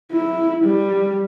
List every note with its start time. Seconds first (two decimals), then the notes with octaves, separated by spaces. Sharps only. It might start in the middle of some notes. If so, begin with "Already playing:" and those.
0.12 E4
0.64 G3